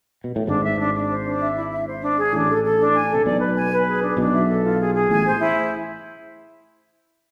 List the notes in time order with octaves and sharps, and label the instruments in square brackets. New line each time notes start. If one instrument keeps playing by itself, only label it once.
[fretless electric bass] B2
A2
[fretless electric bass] G#1 G#2 [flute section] D4
[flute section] E5
D4
D4
C5
D4
E5
E4
E5
C5
D4
G#4
[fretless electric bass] A1 A2 [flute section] D4
[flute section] A4
A4
D4
G#5
[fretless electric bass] C3 [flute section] A4
[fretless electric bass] B1 B2 [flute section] D5
[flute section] B4
G#5
B4
G#4
D4
[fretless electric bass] B1 B2 [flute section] D4
[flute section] E5
A4
F4
G#4
G#4
[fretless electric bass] A1 A2 [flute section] G#5
[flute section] C5
E4